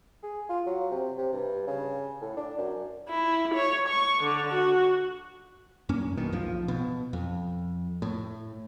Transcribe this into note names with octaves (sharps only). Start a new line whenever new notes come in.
G#4
F4
F#3
C3
C3
G2
C#3
A2
D4
F#2
E4
C#5
C#6
D3
F#4
F#2 A#3 C#4
A#1 F#2 B2 D#3
D1 B1 F3
B2
F2
A2